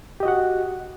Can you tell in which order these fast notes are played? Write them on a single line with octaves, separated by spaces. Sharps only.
G4 D#5 F#4 F#5